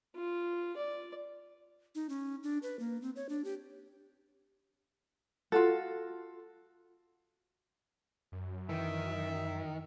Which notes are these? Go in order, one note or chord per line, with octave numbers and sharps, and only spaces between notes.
F4
D5
D#4
C#4
D4
B4
A#3
C4
C#5
D4
G4
F4 F#4 A4
F#2
D#3 E3 E5